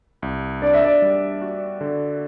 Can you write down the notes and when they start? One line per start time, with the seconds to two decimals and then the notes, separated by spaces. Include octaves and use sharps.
0.22 C2
0.62 D4 D5
0.73 E5
0.84 D5
1.02 G3
1.42 F#4
1.81 D3